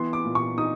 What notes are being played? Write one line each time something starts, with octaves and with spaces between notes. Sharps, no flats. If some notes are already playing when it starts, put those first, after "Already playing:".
Already playing: E3 B3 C6
D6
A#2
C#6
D#4 D#6